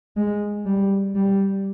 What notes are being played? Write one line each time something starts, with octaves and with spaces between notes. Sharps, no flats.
G#3
G3
G3